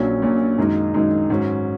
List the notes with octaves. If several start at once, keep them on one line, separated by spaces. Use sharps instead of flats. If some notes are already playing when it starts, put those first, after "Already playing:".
Already playing: A#1 A#2 F#3 C#4
A#1 A#2 F#3 C#4
F#2 D#3 G#3 D#4
F#2 D#3 G#3 D#4
G#2 F#3 C#4